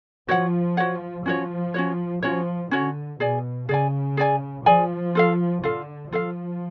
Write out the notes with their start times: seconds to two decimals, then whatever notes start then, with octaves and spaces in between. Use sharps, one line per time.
0.28 F3 F#4 C#5 F#5
0.77 F#4 C#5 F#5
1.26 F3 C#4 F#4 C#5
1.74 C#4 F#4 C#5
2.23 F3 C#4 F#4 C#5
2.71 D3 C#4 F#4 C#5
3.20 B2 G#4 D5 G#5
3.69 C#3 G#4 D5 G#5
4.17 G#4 D5 G#5
4.66 F3 G#4 D5 G#5
5.15 F4 A4 F5
5.64 D3 F4 A4 F5
6.12 F3 F4 A4 F5